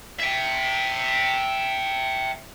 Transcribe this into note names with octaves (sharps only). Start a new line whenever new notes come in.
E5 G5